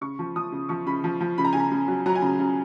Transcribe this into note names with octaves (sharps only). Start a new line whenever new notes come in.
C#3 C#6
F3
F3 D#6
C#3
F3 C#6
C#3 B5
F3
F3
C#3 B5
A#5
C#3 G#5
A#5
C#3
F#3
F#3 A#5
G#5
C#3 A#5
C#3